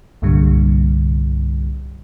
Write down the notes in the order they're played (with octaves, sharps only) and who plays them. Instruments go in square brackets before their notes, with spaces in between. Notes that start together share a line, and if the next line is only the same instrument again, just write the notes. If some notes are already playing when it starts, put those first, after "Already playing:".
[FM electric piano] C2 G2 A#2 D3 G3